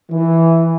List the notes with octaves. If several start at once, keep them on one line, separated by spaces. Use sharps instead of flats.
E3